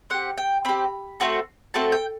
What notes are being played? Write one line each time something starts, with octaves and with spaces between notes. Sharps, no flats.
C4 G4 F#5
G5
C4 G4 B5
A3 C4 F#4 A4
A3 C4 F#4 A4 A5
G5